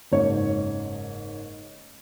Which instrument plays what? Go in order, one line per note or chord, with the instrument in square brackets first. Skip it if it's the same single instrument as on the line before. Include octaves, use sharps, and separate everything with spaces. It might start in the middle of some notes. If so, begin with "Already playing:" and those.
[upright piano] F#1 G#2 C#5